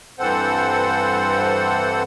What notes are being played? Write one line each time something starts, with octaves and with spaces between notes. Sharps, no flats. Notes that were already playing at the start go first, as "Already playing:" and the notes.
G2 E3 C4 A4 C5 F#5